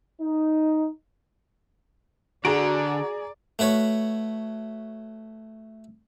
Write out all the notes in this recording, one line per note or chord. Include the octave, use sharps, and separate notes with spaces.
D#4
D3 F#4 G#4 D5 A#5 D7
A3 F#4 B4 C#5